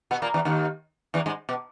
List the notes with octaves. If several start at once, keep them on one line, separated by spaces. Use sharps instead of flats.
B2 B3
A#2 A#3
E2 E3
D#2 D#3
E2 E3
G#2 G#3
B2